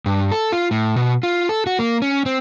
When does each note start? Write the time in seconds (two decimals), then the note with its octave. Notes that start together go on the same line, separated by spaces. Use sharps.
0.06 G2
0.32 A4
0.52 F4
0.71 A2
0.96 B2
1.23 F4
1.49 A4
1.67 F#4
1.79 A#3
2.02 C#4
2.26 C4